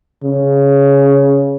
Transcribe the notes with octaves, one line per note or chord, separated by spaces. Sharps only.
C#3